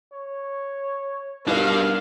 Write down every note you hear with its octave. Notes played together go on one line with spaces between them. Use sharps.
C#5
B2 G3 D4 D#4 A#4 F5